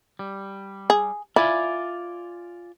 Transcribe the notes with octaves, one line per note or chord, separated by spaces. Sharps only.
G3
G#4
E4 F4 D5 G#5